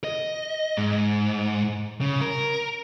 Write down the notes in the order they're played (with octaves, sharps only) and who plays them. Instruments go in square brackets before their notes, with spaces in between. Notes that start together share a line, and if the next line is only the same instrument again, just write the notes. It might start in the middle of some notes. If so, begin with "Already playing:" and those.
[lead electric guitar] D#5
G#2
C#3
A#4